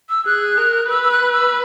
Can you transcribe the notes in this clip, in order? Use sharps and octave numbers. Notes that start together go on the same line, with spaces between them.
E6
G#4 F#6
A#4
B4 E6
E6
F#6
E6